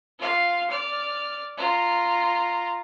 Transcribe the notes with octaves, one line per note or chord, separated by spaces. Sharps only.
F4 F5
D5 F6
F4 A#5